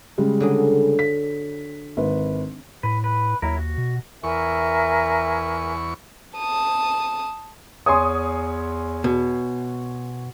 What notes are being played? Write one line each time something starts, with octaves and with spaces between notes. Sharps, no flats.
C#3 G3 G#3
D3 F#3 G#4
B6
G#1 B4
A2 B4
B4
D#2 F#3 E4 A#4
F#4
B2
E2 A#4 E5 G#5 C#6
A5 D#6
E2 C#5 G#5 C6 D#6
B2